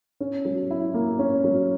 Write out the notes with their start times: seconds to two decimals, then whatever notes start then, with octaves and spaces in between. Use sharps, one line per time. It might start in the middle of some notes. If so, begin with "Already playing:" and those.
0.20 C#4
0.45 F#3
0.71 E4
0.94 A#3
1.19 C#4
1.44 F#3